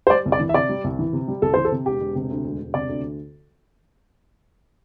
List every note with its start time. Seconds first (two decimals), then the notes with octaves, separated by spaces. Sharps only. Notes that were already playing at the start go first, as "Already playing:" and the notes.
0.07 C5
0.10 G3 D5
0.26 C2
0.32 D5
0.40 E3
0.49 E5
0.54 C3 D5
0.69 G3
0.84 C2
0.99 E3
1.13 C3
1.28 G3
1.42 C2 A4
1.54 E3 C5
1.65 A4
1.72 C3
1.86 E1 G4
2.01 E1
2.15 C3
2.30 D2
2.44 E1
2.59 E1
2.74 C3 D5
2.89 D2